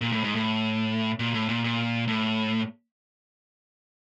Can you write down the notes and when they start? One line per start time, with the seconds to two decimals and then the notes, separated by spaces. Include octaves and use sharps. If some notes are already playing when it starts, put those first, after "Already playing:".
0.01 A#2
0.12 A2
0.24 G#2
0.35 A2
1.20 A#2
1.34 A2
1.49 A#2
1.64 A#2
2.08 A2